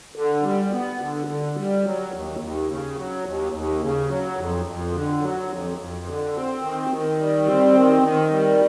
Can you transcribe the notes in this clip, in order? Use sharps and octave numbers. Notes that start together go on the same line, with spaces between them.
D3
G3
B3
D3
D3
G3
F#3
D#2
D#2
C#3
F#3
D#2
D#2
C#3
F#3
F2
F2
D3
F#3
F2
F2
D3
C4
D#3
D#3
G3
C4
D#3
D#3
G3